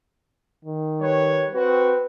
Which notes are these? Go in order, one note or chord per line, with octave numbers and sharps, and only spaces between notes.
D#3
G3 B4 C#5
C4 F#4 B4